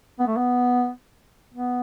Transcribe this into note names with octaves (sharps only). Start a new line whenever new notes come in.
B3
A3
B3
B3